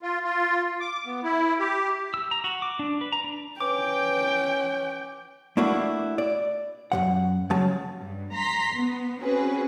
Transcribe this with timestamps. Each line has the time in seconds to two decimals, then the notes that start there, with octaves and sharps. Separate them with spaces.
0.02 F4
0.24 F4
0.81 D6
1.06 B3
1.24 E4
1.60 G4
2.14 E6
2.31 A#5
2.44 F#4
2.62 D6
2.79 D4
3.01 B4
3.12 A#5
3.24 D4
3.61 C#4 B4 G5 D6
5.57 A3 A#3 D4 E4 F#4
6.18 D5
6.92 F#2 F3 F#5
7.50 C#3 F#3 A5
8.01 G2
8.34 A#5 C6 B6
8.76 B3
9.20 C4 C#4 F#4 G#4 B4